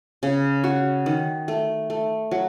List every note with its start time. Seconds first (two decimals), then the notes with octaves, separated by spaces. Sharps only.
0.23 C#3
0.64 F#4
1.06 D#3
1.48 A3
1.90 A3
2.31 F#3